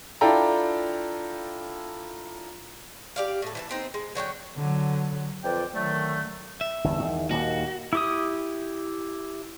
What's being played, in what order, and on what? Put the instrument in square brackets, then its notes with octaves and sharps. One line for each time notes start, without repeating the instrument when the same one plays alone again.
[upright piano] D4 E4 F4 A4 G5 A#5
[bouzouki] G4 D5 F5
A2 A4
E3 D5 A5
B3 C4 D#4
G#3
D3 F#3 C#5 G5
[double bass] D3 F#3
[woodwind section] F2 F4 B4 D5 G5
D3 D#3 F#3 A3
[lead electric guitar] E5
[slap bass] G1 E2 G2
E2 D#3
[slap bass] D#2 A#2 A#3 [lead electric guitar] F#4
[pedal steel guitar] E4 G4 D#6